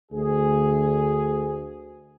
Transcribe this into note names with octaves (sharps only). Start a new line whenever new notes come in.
D2 G#4